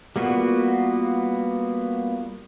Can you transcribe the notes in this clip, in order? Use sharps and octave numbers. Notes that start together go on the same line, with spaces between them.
G3 A#3 B3 F4 F#4